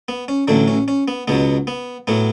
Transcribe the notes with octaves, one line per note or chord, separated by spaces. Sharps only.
B3
C#4
A1 A2 D3 F#3 D4
C#4
C#4
B3
C#2 B2 F#3 B3
B3
A2 F#3 B3